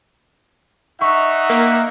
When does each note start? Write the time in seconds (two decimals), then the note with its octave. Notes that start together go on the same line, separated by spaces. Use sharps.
1.01 D#4 E5 F#5 C#6
1.50 A#3